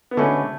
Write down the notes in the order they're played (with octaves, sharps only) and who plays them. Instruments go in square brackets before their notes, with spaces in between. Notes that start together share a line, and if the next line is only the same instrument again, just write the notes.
[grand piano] B3
[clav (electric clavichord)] D3 G#3 C#4 F#4 B4 [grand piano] A3